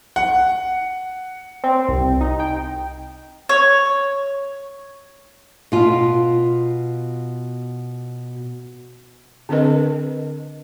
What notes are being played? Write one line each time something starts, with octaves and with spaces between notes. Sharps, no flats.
F#5
C4
C2
D#4
G5
C#5
B2 F4
D3 C4 D4 A#4 B4 D#5